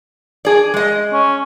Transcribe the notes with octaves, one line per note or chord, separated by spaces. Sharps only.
G#4 D5
G#3 D#5
C#4